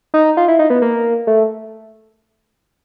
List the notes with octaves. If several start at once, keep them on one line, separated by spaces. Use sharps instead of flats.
D#4
F4
E4
D#4
B3
A#3
A3